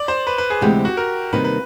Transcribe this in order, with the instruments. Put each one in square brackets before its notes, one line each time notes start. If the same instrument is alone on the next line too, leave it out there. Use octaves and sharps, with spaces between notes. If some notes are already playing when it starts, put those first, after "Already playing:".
Already playing: [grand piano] D5
C5
B4
B4
G#4
[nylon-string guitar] D2 C3 E3 G#3 B3 [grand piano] G4
[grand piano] F#4
A#4
[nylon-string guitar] C3 D#3 G3 A#3 D#4 [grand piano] B4
[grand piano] B4